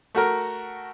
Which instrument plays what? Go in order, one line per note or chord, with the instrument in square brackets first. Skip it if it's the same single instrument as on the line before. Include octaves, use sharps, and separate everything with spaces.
[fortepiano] A3 F#4 A#4